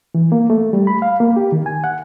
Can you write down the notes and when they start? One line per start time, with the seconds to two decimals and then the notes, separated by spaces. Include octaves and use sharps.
0.15 E3
0.32 A#3
0.50 A3
0.73 G3
0.87 B5
1.02 F5
1.20 A#3
1.36 G4
1.52 D#3
1.66 G#5
1.84 F#5